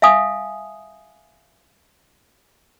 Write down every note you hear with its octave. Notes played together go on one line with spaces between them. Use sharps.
E5 F5 G#5 D#6